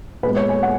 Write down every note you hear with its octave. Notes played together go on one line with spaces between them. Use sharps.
A#2 G#3 B3 B4
C#5
G#5
F#5